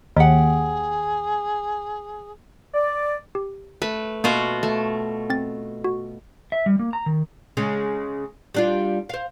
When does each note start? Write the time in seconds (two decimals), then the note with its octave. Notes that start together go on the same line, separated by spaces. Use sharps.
0.16 D#2 G4 G#4 F#5
2.74 D5
3.35 G4
3.82 A3 B4
4.24 B2 A#3 F4 F#4
4.63 A3
5.30 C4 A6
5.84 F#4
6.52 E5
6.66 G3
6.79 A#3
6.93 A#5
7.06 D#3
7.57 C#3 G#3 C#4
8.54 G3 D4 F4
9.09 C5 F5